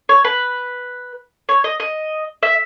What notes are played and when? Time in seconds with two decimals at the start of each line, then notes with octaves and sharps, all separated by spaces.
0.09 C#5
0.25 B4
1.49 C#5
1.64 D#5
1.80 D#5
2.43 E5